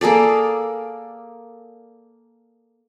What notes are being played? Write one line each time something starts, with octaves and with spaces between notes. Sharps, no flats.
A#3 G#4 A4 D5